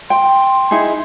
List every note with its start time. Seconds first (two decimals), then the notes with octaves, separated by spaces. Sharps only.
0.10 G5 C6
0.71 D#4 E4 G#4